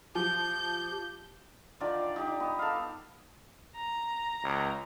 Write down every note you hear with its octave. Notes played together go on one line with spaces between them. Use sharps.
F3 G4 G6
D3 D#3 F4 D5
D#4 G4
B3
A4 F5
A#5
C#2